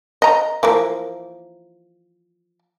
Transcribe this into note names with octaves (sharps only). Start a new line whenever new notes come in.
D#5 A#5
E3 F3 A#3